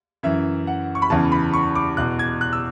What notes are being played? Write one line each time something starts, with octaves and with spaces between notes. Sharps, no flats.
F#2 E3 E5
F#5
C#6
B5
E2 C#3 E3 A5
B5
C#6
D6
E2 B2 F#6
G#6
F#6
E6